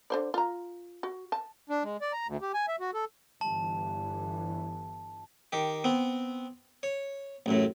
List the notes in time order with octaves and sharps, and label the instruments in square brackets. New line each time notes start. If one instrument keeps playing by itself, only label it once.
[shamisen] D3 C5 D5
F4 A#5
F#4
A5
[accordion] D4
G#3
D5
A#5
D2
G4
G#5
E5
F#4
A4
[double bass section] G1 G2 E3 [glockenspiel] A5
[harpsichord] D#3 G4
B3 C4
C#5
A1 F#2 A2